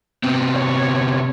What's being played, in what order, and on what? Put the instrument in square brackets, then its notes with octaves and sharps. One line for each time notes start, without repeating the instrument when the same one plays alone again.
[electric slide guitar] C3 B3 C4
[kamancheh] C#5